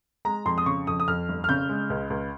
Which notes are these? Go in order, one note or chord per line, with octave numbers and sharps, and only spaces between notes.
G#3 A#5
F2 C6
D#6
C#3 C#6
F2 D#6
D#6
F2 F6
G1
F6
C#3 G6
G#3
C#2
C#2